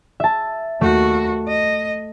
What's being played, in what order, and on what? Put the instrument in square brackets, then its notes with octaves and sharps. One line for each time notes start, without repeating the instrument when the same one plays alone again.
[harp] E5 A5
[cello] D#2 F#4 [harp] A3
[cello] D#5